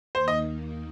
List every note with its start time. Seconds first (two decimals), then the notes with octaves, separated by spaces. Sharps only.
0.15 D#2 D#3 A#3 C5
0.28 D#5